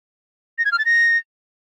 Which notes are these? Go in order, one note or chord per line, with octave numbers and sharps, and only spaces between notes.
A#6
G#6
F6
A6
A#6